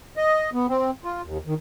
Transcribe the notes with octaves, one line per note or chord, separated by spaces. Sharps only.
D#5
B3
C4
F4
D#2
D#3